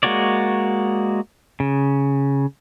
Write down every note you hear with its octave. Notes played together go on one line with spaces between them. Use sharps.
G#3 A#3 F#4 C#5 D5
C#3